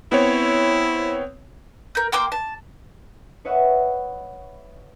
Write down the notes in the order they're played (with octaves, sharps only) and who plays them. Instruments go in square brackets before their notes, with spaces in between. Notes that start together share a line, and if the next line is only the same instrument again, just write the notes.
[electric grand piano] B3 C4 C#5 [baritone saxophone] E4
[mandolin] A#4 G6
A#3 G5 C6 D6
A5
[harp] B4 C#5 D#5 E5 F#5 C#6